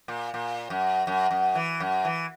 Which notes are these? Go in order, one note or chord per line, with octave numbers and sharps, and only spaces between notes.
A#2
A#2
F#2
F#2
F#2
E3
F#2
E3